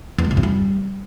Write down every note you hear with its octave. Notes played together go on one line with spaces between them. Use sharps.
E2
G#3
C3
G2
G3